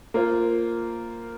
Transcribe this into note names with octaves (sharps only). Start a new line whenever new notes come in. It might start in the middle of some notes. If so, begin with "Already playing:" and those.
A#3 F4 C5